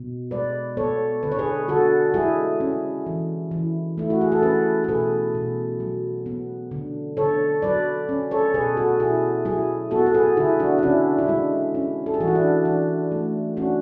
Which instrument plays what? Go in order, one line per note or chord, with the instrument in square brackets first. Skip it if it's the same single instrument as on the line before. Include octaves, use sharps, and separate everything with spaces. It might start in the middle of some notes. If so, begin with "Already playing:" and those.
Already playing: [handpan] B2
G#3 B4 D5
B3 A4 C#5
D3 B4
C#5
G#4 B4
D3 F#4 A4
G#3 E4 G#4
C#4
E3
E3
A3 E4
F#4
G#4
A4
C#4 G#4 B4
A4
B2 G#4 B4
B2
F#3
B3
D3
D3 A4 C#5
F#3 B4 D5
C#4
A4 C#5
B2 G#4 B4
F#4 A4
B2 E4 G#4
F#3 E4 G#4
B3 F#4 A4
A4
G#4 B4
D3 E4 G#4
D4 F#4
D4
D3 C#4 E4
E4
G#3 D4
C#4
A4
G#4
E3 F#4
E4
D4
E3 D4
A3
C#4 D4 F#4